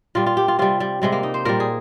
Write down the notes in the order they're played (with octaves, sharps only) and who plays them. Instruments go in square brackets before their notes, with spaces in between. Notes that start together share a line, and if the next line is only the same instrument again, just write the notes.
[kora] A#2 G3 F4
F4
G4
F4
C3 G3 F4
G3
C3 G3 G#3
A#3
D#4
C5
A#2 G3 A#4
G#4